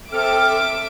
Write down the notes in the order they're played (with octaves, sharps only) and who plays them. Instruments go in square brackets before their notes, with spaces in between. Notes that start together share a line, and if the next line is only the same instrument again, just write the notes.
[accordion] C4 A4 [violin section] E5 D6 D7 [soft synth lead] F6